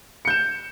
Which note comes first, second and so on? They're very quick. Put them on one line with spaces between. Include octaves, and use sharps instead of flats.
C#7 G6 E7